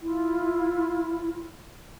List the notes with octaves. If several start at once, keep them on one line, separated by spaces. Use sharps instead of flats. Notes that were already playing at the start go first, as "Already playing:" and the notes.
E4 F4